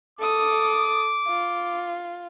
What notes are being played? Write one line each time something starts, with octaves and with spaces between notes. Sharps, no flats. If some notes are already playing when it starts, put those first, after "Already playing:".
A4 D6 D#6
F4